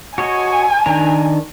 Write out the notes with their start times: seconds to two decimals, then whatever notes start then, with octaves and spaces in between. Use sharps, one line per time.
0.18 F#4 C#5 D#5 G#5
0.86 D#3 D4 A#5